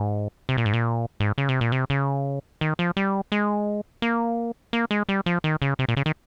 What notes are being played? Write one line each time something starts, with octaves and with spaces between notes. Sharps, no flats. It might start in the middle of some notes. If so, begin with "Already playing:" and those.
Already playing: G#2
C3
A#2
G#2
A#2
G#2
C#3
C3
A#2
C3
C#3
D#3
F3
G3
G#3
A#3
A#3
G#3
G3
F3
D#3
C#3
C3
A#2
C#3
D#3